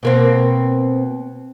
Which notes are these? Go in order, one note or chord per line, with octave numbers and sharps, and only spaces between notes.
B2 A#3 C4